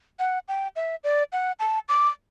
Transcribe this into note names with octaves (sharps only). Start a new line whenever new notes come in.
F#5
G5
E5
D5
F#5
A5
D6